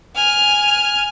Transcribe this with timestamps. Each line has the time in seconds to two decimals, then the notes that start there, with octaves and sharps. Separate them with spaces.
0.15 G#5 F6